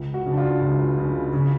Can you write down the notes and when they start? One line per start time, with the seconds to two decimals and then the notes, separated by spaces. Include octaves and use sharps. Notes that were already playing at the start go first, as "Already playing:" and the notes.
Already playing: C#2
0.14 F#4
0.26 C#3
0.32 D4
0.37 F4
0.61 C#2
0.98 C#3
1.33 C#3